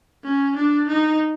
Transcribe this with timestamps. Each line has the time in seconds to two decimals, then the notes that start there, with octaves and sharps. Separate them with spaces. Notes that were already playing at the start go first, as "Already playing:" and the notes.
0.24 C#4
0.56 D4
0.88 D#4